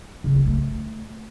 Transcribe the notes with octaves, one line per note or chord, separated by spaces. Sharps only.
C#3
C4
A3